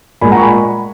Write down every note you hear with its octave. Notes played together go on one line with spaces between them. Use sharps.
A#2 G#3 G#5 B5
F#5 A#5
C#6
G#5 B5